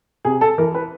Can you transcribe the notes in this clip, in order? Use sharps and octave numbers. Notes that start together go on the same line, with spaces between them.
C3 G#4
A4
E3 A#4
B4